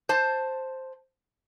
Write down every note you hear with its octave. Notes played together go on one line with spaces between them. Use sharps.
C5 A5